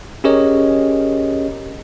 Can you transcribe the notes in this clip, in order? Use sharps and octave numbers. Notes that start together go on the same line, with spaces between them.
C#4 G4 G#4 A#4 C#5 D#5